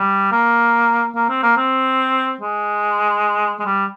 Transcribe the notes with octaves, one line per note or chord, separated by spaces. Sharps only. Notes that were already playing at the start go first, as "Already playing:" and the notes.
Already playing: G3
A#3
A#3
C4
A#3
C4
G#3
G#3
G3